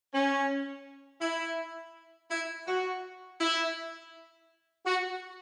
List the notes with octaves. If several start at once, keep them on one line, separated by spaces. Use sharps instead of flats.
C#4
E4
E4
F#4
E4
F#4